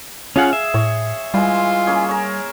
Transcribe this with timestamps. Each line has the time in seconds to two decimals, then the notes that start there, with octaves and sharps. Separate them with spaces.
0.36 C#4 F4 G#4 F5 F#5
0.53 E5
0.74 A2 C#5
1.34 E3 G3 G#3 F4
1.87 A#3 C#4 G#4
2.08 A#4 C#5